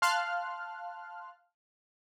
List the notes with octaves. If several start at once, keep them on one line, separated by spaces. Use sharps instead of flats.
F5 A5 C6 F6 F#6